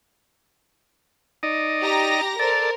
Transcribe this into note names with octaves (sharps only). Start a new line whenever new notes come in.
D#4 D5 D#5
G4 A#5 A#6
A4 A#4 C5 D5